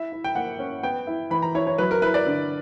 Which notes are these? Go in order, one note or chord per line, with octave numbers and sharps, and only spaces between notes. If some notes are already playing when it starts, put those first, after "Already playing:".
Already playing: E4 E5
E4
G5
A#3 F#5
C#4
B3 G5
E4
E3 B5
A#5
E4 C#5
C#5
F#3 B4
A#4
E4 B4
D5
D3